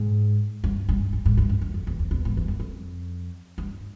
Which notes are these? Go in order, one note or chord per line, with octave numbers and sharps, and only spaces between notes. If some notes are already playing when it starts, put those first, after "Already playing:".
Already playing: G#2
G2
G2
G2
G#2
G2
F#2
F#2
F2
E2
F2
E2
G#2
G2
F#2
F2
G2